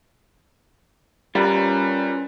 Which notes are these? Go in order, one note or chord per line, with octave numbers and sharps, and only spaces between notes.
G3 C#4 F4 A#4 B4